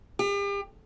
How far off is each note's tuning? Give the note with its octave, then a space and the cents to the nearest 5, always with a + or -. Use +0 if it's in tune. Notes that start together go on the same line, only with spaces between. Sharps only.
G4 +40